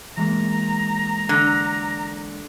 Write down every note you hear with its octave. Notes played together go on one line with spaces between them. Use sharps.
E3 G#3 A#3 A#5
D3